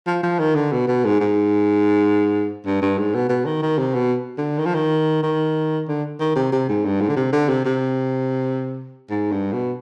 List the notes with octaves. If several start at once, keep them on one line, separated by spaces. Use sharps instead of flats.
F3
F3
D#3
D3
B2
B2
G#2
G#2
G2
G2
G#2
B2
B2
D#3
D#3
C3
B2
D3
D#3
F3
D#3
D#3
D3
D#3
C3
C3
G#2
G2
G#2
D3
C3
D3
C3
C3
G#2
G2
B2